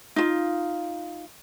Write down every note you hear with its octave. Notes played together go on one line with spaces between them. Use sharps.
D#4 F4